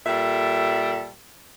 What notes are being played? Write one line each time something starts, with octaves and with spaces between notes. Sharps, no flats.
A#2 G3 A4 E5